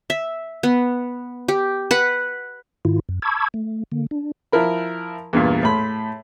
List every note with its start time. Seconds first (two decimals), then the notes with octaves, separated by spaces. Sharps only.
0.10 E5
0.63 B3
1.48 G4
1.91 B4 F#5
2.85 G#2 D#3 E4 F4
3.09 F#2
3.22 A5 B5 C#6 D6 E6 G#6
3.54 A3
3.92 D3 A#3
4.11 D4
4.52 F3 E4 A#4 B5
5.33 E2 G2 A#2
5.63 A2 B5 C6